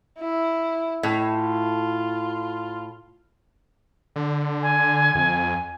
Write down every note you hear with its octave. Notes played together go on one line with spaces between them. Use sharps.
E4
A2
F4
D3
G#5
F2